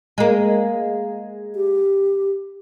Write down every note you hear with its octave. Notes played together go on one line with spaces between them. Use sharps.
G#3 A#3
G4